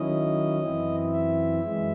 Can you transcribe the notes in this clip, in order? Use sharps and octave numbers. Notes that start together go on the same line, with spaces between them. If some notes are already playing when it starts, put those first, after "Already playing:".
Already playing: D#3 F#3 C#4 E4 D#5
F#2 E3 C4 E4
E5
F#2 E3 G#3